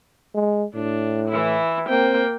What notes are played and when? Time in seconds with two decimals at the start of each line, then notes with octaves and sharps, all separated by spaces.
0.35 G#3
0.75 A2 D4
1.28 E3 E4
1.89 A#3 C4 G5